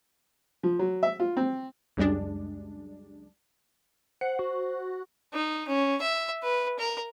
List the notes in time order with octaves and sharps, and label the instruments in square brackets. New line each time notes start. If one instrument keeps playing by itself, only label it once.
[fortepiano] F3
F#3
E5
F4
C4
[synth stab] C#2 F#2 G3 G#3 D4
[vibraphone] C5 [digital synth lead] F#5
[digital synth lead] F#4
[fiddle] D#4
C#4
E5
B4
A#4